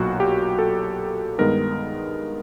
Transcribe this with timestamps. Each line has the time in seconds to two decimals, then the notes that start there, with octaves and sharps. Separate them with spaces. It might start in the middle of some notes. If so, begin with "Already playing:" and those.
Already playing: B1 A#2 F#3 F#4
0.20 G4
0.59 A4
1.38 G2 D#3 G#3 B3 D#4 A#4